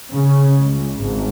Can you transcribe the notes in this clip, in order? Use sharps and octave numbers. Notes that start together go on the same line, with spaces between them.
C#3
C#2
G#1